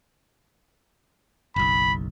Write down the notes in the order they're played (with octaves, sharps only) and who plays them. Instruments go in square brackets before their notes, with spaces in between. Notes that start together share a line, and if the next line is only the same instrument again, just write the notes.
[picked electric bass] F#1 B1 [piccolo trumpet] B5